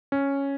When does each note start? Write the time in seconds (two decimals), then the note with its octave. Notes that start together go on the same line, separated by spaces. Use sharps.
0.12 C#4